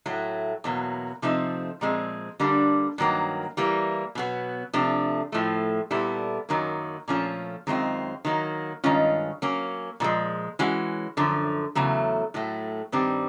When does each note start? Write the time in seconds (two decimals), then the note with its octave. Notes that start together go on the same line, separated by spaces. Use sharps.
0.06 A2 F#3 A3
0.64 E2 B2 F#3 A#3
1.22 C3 F3 A3 C4 D#4
1.81 A#2 F3 G#3 C4
2.39 D3 G3 A#3 D4
2.98 G2 D#3 F#3 A#3
3.57 E3 G3 A#3
4.15 B2 F#3 B3
4.73 C3 F3 A3 D4
5.32 A2 F3 A3
5.91 A#2 G3 B3 E4 A4
6.49 F#2 D#3 F#3 A#3
7.08 A#2 F3 A3 C#4 F4
7.67 F#2 D#3 G#3 C4 F4
8.25 D#3 F#3 A#3
8.84 G2 D#3 G#3 C#4 F4
9.42 F#3 A#3 C#4
10.00 A#2 F3 G#3
10.59 E3 G#3 C#4 F#4
11.17 F#2 D3 F3
11.75 E2 C#3 F#3 A3
12.34 A2 F#3 A3
12.92 G2 D#3 G3 C4